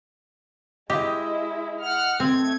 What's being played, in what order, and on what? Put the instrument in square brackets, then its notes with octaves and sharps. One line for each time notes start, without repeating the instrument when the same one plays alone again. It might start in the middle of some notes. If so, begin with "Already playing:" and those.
[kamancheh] G#3 E4 [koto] G4 [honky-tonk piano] D#5
[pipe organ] F#5 F6
[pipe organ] A3 G#6 [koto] C4